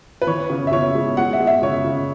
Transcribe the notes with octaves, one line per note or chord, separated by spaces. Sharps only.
B4
E3 C#5
C#3
E5
C#3 C#5
G#3
G#3 F#5
E5
G#3
E5
C#3 C#5
C#3